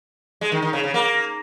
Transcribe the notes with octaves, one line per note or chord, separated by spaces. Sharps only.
G#3
D#3
D#3
C#3
C#3
A#3